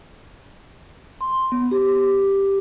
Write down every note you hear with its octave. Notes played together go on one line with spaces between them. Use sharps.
C6
B3
G4